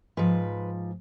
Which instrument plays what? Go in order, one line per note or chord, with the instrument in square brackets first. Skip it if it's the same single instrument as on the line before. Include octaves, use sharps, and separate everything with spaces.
[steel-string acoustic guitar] G#2 F3 B4